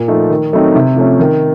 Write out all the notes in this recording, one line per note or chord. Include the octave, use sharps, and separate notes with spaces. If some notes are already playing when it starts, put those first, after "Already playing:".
Already playing: A#2
F3 A3 D#4
D#3
F#3 A3 C4 D#4
C3
F3 A3 C#4
D#3